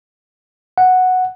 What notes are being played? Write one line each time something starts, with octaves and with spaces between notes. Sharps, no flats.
F#5